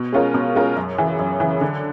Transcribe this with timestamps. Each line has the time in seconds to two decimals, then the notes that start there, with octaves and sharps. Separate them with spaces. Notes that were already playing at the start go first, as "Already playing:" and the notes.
Already playing: B2
0.12 G#3 C#4 F4 A#4
0.34 B2
0.55 G#3 C#4 F4 A#4
0.76 F#2
0.98 C#3 E3
1.19 F#2
1.40 C#3 E3
1.61 D3